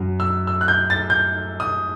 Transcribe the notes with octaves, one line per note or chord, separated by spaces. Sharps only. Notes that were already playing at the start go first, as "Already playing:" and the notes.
Already playing: F#2 F#3
E6
E6
F#6
G6
A6
G6
D#6